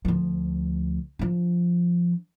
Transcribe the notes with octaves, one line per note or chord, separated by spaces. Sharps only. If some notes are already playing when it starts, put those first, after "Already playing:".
D2 F3
F3 D4